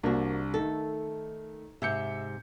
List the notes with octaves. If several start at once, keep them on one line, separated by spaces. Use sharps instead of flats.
C2 A#3 D4 F#4
D#3 A3 A4
G#2 C3 E5 G6 C#7